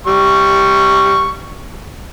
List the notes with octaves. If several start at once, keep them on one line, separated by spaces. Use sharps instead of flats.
G3 C#6